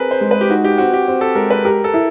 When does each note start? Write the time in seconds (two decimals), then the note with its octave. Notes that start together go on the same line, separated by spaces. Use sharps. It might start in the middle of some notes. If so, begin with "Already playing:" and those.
Already playing: C4 G#4 A#4 B4
0.11 C5
0.21 G#3
0.31 B4
0.41 G4
0.49 D#4 F#4
0.64 G4
0.78 C4 F#4
0.93 G4
1.08 C4
1.21 A4
1.35 G#3 A#4
1.50 B4
1.65 G4 A#4
1.84 A4
1.94 E4